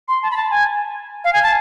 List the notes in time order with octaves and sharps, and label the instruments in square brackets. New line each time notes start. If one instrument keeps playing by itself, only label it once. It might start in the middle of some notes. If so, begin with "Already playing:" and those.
[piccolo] C6
A5
B5
A5
G#5
F5
G#5
A5